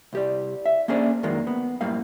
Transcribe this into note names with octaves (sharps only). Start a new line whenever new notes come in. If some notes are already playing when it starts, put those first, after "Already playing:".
C2 G4 D5
E5
A#3 C#4 D4 G#4 C5 D5
F2 D#3 F#3 G#3 A#3
B3
F#2 A2 G3 A#3 F5